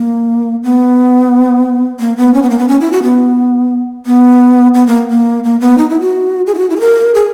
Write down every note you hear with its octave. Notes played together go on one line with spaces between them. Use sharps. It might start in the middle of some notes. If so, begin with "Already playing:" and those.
Already playing: A#3
B3
A#3
B3
C#4
B3
A#3
B3
C#4
E4
F#4
B3
B3
B3
A#3
A#3
A#3
B3
D#4
E4
F#4
G#4
E4
F#4
E4
G#4
A#4
G#4